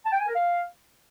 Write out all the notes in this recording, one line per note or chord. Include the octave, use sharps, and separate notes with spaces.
A5
G5
G#5
A#4
F5